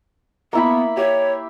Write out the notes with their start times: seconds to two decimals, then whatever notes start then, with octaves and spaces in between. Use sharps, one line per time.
0.53 A#3 B3 E4 B5
0.97 G4 C#5